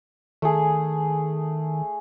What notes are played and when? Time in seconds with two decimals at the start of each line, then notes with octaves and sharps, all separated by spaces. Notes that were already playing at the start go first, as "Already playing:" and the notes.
0.42 D#3 A3 G#4